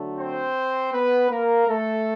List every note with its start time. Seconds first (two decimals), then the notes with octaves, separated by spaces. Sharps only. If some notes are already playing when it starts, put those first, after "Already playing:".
Already playing: D3 F#3 A3
0.18 C4 C5
0.93 B3 B4
1.31 A#3 A#4
1.68 A3 A4